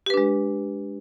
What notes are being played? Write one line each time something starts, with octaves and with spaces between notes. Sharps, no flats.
G#3 D4 G4 B4